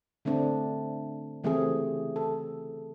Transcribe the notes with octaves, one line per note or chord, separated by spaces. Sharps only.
D3 A3 C4 D4
C#3 E3 A3 C4 G4 G#4
A4